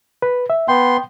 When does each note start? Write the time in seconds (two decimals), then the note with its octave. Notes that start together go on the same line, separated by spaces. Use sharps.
0.22 B4
0.50 E5
0.68 B3 G5 C6